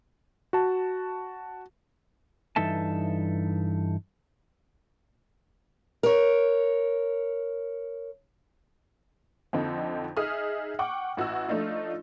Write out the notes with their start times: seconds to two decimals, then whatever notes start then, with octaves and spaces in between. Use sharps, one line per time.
0.53 F#4 A5
2.56 G2 E3 D#4 A4 E5 A5
6.03 A#4 C#5
9.53 F2 D3 C4 D#4
10.17 D#4 G#4 E5 D#6 F6
10.79 F#5 G5 C#6 D6
11.17 A1 F#4 D#5 E6
11.49 F3 A3 D4 D#4 F4